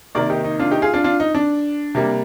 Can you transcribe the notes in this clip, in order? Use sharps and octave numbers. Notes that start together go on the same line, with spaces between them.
C3 D#3 A#3 A#4 D5
D#4 G4
D#4
D4 F4
D#4 G4
F4 G#4
D4 F4
D4 F4
D#4
D4
C3 G3 A#3